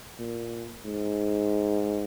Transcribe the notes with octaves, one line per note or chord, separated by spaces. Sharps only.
A#2
G#2